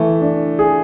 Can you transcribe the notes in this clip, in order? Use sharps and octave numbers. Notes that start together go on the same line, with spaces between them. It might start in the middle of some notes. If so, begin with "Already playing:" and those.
Already playing: E3 A3
D4
G#4